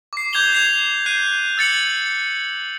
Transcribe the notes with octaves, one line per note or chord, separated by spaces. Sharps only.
D6 C7
D6 G6 G#6 C7 F7 G7
G#6 C7 F7
F#6 G6 C7 D#7
E6 A6 C#7 F#7